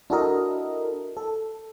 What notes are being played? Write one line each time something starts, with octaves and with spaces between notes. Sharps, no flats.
D4 E4 F#4 A4 A#4 D#5
A4